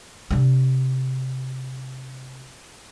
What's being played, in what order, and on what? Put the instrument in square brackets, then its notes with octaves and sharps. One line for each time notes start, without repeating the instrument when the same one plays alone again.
[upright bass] C3 D4